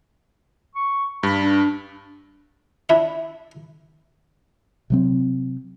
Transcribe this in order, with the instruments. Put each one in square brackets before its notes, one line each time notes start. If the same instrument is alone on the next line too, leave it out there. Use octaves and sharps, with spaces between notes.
[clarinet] C#6
[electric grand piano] G2 [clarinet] B5
[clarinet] D4
[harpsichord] D4 E4 E5
[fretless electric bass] C3 F#3 C4